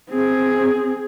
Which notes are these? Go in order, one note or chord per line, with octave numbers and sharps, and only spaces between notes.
C4 G#4